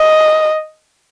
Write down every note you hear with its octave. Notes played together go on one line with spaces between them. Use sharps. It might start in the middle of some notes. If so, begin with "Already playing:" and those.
Already playing: D#5